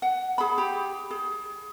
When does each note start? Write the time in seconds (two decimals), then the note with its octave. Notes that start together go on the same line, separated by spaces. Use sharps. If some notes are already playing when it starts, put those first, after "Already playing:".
0.02 F#5
0.38 G#4 B5
0.58 G4
1.11 G#4